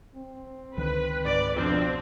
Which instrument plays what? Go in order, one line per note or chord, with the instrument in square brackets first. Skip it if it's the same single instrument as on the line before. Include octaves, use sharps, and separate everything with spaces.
[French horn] C4
[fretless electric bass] C#2 D3 D#3 [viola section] B4
[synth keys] G#2 B4 [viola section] D5
[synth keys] F2 F3 D4 [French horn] B2 [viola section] C4